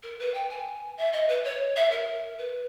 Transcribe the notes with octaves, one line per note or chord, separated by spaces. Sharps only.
A#4
B4
G5
G#5
E5
D#5
B4
C#5
E5
A#4
B4